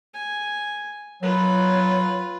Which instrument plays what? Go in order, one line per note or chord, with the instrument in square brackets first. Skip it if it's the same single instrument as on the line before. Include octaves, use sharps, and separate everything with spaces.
[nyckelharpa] G#5
[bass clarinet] F#3 [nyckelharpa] F4 B4